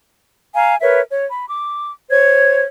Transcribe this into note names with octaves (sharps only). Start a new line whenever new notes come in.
F5 G#5 A#5
A#4 B4 C#5 E5
C#5
B5
D6
C5 C#5 G#6